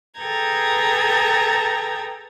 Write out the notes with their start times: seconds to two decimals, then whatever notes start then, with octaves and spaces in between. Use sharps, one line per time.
0.19 G#4 A4 B4 G5 A#5 G#6